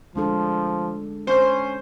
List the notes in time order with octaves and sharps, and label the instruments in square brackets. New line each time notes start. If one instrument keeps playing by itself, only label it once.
[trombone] F3 [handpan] G#3 D4 A4
[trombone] C#4 [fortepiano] C5